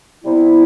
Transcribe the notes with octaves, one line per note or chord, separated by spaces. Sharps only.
C3 G3 B3 E4